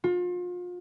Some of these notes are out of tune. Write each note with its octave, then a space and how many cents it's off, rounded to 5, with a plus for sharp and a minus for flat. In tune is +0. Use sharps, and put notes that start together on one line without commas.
F4 +35